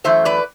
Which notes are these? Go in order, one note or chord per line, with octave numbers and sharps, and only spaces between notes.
F#2 E3 A3 C5 E5
B4 D5